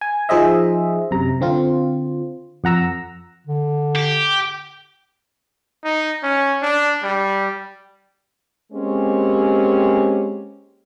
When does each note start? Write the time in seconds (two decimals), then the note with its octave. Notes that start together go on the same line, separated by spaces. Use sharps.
0.01 G#5
0.29 F3 D#4 G#4 C5 D#5 E5
1.11 F#2 C3 A#5
1.41 D3 C4 F4
2.64 F2 F#5 A#5 E6
3.47 D3
3.96 G4
5.84 D#4
6.23 C#4
6.62 D4
7.03 G3
8.73 G#3 A#3 C4 C#4 G4